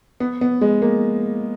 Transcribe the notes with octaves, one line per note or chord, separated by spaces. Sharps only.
B3
B3
G#3
A#3